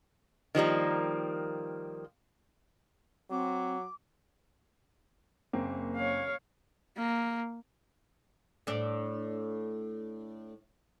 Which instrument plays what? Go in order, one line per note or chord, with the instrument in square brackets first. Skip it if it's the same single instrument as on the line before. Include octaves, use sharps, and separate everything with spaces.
[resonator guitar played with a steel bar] D#3 F3 G3 A#3
[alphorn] F#3 [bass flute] C4 [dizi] D6
[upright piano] F#1 A#3 C4
[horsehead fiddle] C#5 F5
A#3
[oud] A2 D4